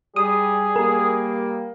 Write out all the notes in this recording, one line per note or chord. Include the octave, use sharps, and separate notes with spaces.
G3 G#4 D#6
G3 A#3 A#4